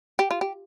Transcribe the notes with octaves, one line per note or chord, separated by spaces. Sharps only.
G4
F4
G4